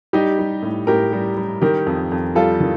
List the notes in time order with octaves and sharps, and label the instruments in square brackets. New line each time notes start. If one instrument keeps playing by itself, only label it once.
[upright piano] G3 D#4 G4
G3
A2
A2 G4 A#4
G3
G3
D#3 G4 A#4
F2
F2
G3 F4 A4
D#3